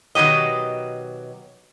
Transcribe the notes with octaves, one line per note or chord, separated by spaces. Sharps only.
B2 D#3 F#3 G4 D#5